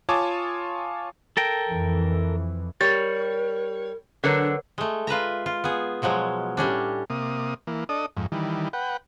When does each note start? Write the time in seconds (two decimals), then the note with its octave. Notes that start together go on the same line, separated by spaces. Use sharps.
0.09 F4 C#5 G#5 A5 D6 D#6
1.37 A4 A#4 G5
1.69 F2 E3
2.81 G3 G4 A#4 C#5 A6
4.24 D3 F#3 D4 A#4 B4 C#5
4.78 G#3 A3
5.07 F4 B4 E5 A#5
5.46 F4
5.64 B3 G#4
6.02 B2 F3 F#3 G#3
6.57 A2 G3 C#4 D4
7.10 C3 A#3 D#6
7.67 E3 A#3
7.89 D4 A4 D#5 D#6
8.17 F2 G#2
8.32 D#3 E3 G3
8.73 B4 F#5 G5